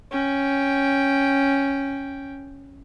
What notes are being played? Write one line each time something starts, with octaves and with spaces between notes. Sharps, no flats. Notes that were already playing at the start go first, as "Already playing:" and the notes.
C#4 G5